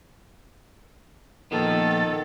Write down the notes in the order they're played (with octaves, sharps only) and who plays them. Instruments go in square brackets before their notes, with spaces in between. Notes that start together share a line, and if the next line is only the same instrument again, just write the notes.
[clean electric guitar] A#2 F3 B3 [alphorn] D#3 [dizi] A4